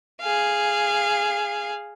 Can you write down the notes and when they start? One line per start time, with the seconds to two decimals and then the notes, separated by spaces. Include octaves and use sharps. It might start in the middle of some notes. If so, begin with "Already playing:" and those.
0.21 G#4 F5